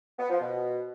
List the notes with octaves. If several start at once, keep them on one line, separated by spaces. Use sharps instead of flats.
B3
F3
B2